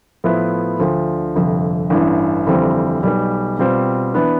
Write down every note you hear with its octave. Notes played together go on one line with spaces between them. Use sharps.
A2 F3 B3 E4 B4
D2 D3 F3
G1 F2 C3
A1 G2 E3
G1 F2 E3 G3 C4
B1 B2 G3
B2 G3 C4 F4 C5
E3 B3 D4